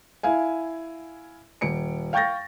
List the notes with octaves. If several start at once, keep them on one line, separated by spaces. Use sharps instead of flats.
E4 F5 G#5
D#1 C#7 D7
F5 G5 C#6 G6 A6 A#6